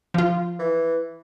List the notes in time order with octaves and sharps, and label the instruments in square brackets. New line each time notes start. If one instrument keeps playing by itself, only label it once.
[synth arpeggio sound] F3 F4
[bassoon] E3